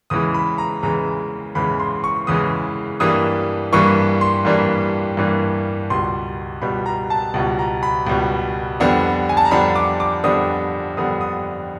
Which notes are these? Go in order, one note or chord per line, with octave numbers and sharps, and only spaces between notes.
E2 C#3 E3 G#3 D#6
B5
A#5
E2 C#3 E3 G#3 A#5
E2 C#3 E3 G#3 B5
C6
C#6
E2 C#3 E3 G#3 D#6
G2 E3 G3 A#3 D4 D#6
G2 E3 G3 A#3 D4 C#6
C6
G2 E3 G3 A#3 D4
G2 E3 G3 A#3 D4
C#2 B2 G3 C6
C#2 B2 G3 B5
A#5
A5
C#2 B2 G3
A#5
B5
C#2 B2 G3
F2 D3 G3 B3 D4
G#5
A5
A#5
F2 D3 G3 B3 D4 B5
D6
D6
F2 D3 G3 B3 D4 D#6
F2 D3 G3 B3 D4 D#6
D#6